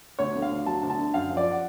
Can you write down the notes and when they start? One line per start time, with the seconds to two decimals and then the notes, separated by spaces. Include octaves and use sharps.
0.19 D2 C#5
0.35 D3
0.42 F5
0.51 D2
0.66 F#3 A5
0.83 D2
0.90 A5
0.99 D3
1.14 F#2 F5
1.30 F3
1.37 D5
1.51 F#5